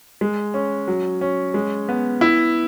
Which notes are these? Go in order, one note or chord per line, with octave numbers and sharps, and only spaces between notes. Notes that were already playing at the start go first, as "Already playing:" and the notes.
G#3
C#4
F#3
C#4
G#3
B3
E4